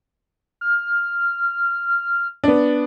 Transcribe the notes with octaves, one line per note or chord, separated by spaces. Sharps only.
F6
B3 D4